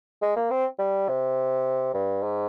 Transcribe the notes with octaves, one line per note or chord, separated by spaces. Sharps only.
G#3
A#3
C4
G3
C3
G2
G#2